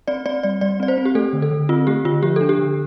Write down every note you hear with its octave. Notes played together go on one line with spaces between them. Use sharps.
C4 D5
C4 D5
G3 D5
G3 D5
C4 D5
C5
C4
G4
A3 A4
D3
A4
D3
C4 F4
A3 G4
D3 F4
F3 G4
D4 A4
G4
D3